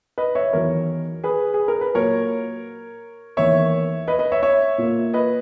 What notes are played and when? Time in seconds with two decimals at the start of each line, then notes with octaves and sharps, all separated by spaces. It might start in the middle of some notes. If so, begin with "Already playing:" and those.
0.18 B4 D#5
0.35 C#5 E5
0.53 E2 D#3 F#3 A#4 C#5
1.24 G#4 B4
1.54 G#4
1.68 A#4
1.81 B4
1.94 A#2 F#3 A#3 A#4 C#5
3.37 E2 D#3 A#3 C#5 E5
4.08 B4 D#5
4.19 B4 D#5
4.32 C#5 E5
4.42 C#5 E5
4.78 A#2 A#3
5.14 B4 D#5